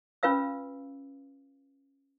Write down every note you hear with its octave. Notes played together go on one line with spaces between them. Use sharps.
C#4 F4 B4 F5 E6